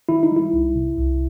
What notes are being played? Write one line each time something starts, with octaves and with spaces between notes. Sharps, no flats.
D#3 E4
D#4
G3
E4
C2
C3
C2